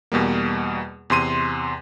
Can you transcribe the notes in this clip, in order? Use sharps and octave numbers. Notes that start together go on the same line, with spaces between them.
E2 B2 G3 A#3
E2 C3 C6 D#7